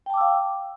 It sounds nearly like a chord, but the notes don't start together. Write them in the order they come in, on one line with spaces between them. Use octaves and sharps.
G5 A5 D6 E6 F5